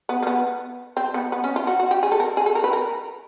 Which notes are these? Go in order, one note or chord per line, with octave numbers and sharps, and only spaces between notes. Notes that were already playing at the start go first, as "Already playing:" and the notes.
B3
A#3
B3
C4
B3
B3
C#4
F4
F#4
F#4
G4
G#4
A4
A#4
G#4
A4
A#4
B4
A#4